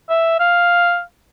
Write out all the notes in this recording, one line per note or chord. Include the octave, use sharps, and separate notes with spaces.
E5
F5